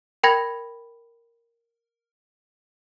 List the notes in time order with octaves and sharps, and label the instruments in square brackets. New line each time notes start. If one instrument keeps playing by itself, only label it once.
[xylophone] A#4 G5 B5 G#6 A#6